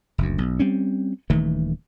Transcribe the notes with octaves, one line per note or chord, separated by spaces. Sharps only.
F#1 D2
B1
G3 C4 C#4
D#1 D#3 E3 A3